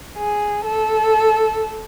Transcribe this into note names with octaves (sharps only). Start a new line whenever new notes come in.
G#4
A4